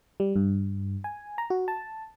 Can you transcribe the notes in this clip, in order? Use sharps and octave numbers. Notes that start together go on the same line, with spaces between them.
G3
G2
G#5
A#5
F#4
A5